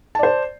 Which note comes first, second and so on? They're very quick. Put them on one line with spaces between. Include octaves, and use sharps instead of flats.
A5 D5 C5